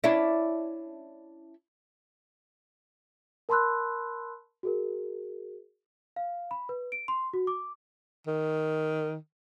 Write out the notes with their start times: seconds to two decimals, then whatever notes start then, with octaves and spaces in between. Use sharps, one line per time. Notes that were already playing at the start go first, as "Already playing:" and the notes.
0.04 C#4 D4 E4
3.49 A#4 A5 B5 C6 E6 F#6
4.63 F#4 G#4 A#4
6.16 F5
6.51 B5
6.69 B4
6.92 D7
7.08 C6
7.33 F#4
7.47 D6
8.27 D#3